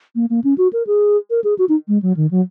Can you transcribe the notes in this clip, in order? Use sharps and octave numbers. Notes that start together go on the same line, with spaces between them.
A#3
A#3
C#4
F#4
A#4
G#4
A#4
G#4
F#4
D#4
G#3
F#3
D#3
F#3